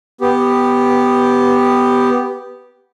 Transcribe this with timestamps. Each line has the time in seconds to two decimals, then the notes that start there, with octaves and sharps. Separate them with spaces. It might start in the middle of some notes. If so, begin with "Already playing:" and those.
0.21 B3 G4